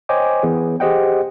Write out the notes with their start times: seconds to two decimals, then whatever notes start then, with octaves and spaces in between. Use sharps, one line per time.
0.09 C5 C#5 D#5 G5 G#5 D6
0.43 E3 B3 G#4
0.80 G4 G#4 C5 D#5 F#5 G5